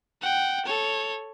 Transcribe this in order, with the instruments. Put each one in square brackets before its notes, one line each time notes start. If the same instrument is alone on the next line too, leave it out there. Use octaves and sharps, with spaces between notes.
[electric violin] F#5 G5
A4 C#5